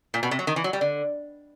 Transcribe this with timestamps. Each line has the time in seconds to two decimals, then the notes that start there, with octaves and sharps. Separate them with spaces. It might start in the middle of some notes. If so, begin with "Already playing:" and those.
0.14 A#2
0.23 B2
0.31 C3
0.39 F#3
0.47 D#3
0.56 E3
0.64 F#3
0.73 G3
0.81 D3